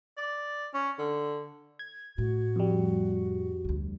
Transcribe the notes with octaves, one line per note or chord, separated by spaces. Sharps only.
D5
C#4
D3
G#6
A2 A3 F#4
F2 G3
D2 D3